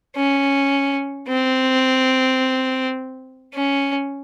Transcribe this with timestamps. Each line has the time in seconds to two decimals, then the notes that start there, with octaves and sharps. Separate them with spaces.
0.16 C#4
1.28 C4
3.54 C#4